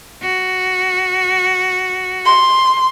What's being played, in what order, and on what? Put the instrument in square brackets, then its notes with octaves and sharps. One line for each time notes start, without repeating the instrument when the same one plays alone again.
[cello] F#4
[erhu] C6